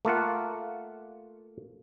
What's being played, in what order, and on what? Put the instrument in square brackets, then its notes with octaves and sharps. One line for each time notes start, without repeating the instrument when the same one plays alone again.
[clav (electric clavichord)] A3 A#3 F4 F#5